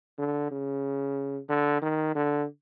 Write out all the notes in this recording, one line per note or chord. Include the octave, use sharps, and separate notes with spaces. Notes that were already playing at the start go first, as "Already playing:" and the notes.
D3
C#3
D3
D#3
D3